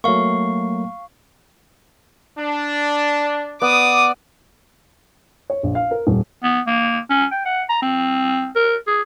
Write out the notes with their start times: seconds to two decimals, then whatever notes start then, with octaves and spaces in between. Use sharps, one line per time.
0.04 F#3 A3 A#3 F5 C#6
2.38 D4
3.62 B3 D5 D6 D#6
5.50 C#5
5.63 A#1
5.75 F5
5.91 A#4
6.07 D#1
6.43 B3
6.67 A#3
7.10 C#4
7.31 G5
7.45 F#5
7.69 A#5
7.82 C4
8.56 A#4
8.87 G#4